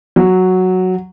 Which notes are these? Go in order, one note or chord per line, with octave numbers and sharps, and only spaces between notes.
F#3